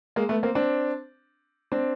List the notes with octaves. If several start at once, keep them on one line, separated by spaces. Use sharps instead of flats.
G#3 A#3
A3 B3
A#3 C4
C4 D4
C4 D4